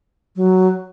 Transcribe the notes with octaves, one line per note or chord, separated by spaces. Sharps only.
F#3